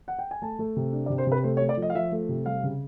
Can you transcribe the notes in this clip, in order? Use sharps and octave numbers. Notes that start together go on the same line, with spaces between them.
F#5
G5
G#5
A3 A5
A3
C3
D4
D5
C3
C5
C3 B4
A3 C5
C#5
A3
D5
F3
D#5
F5
F3 E5
A3
C3
G3 F5
C#3